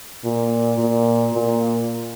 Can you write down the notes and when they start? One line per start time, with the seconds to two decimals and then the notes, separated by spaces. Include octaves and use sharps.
0.24 A#2
0.79 A#2
1.33 A#2